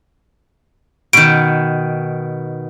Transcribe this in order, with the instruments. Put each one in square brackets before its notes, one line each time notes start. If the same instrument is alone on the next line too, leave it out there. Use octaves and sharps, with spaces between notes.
[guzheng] B2 D#3 [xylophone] D7